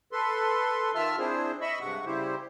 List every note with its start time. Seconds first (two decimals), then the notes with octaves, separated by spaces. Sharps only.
0.12 A4 B4 C6
0.95 D#3 F4 E5 A5 E6 F6
1.19 C4 D4 E4 G#4 C5
1.61 D#5 E5 B5 C#6 E6
1.81 G2 C3 G#3 F#5 C#6
2.06 C#3 G3 E4 G4 C5